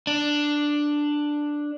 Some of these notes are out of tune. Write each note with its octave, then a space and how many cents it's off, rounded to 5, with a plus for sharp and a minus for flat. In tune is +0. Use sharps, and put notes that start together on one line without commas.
D4 +5